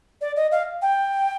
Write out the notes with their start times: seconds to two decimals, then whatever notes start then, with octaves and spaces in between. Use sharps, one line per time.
0.21 D5
0.36 D#5
0.51 F5
0.81 G5